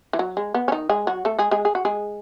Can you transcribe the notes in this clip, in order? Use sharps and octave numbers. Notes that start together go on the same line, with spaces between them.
E3
F#3
G#3
B3
C#4
D#3 D#4
G#3 G#4
F#3 F#4
A3 A4
G#3 G#4
G#3 G#4
G#4
F#4
G#3 G#4